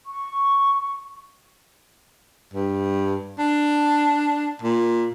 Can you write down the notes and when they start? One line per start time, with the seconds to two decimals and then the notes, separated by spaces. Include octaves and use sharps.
0.07 C#6
2.54 G2
3.39 D4
4.62 A#2